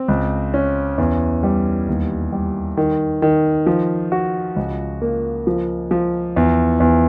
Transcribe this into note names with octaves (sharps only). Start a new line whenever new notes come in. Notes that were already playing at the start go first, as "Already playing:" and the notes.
Already playing: C4
C#2
C#4
E2
G3
D#2
G3
D#3
D#3
F3
F#4
C#2
A#3
F3
F3
E2
E2